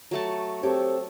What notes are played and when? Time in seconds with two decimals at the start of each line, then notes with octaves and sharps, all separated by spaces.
0.11 F#3 A3 A5
0.63 C4 G4 A4 C#5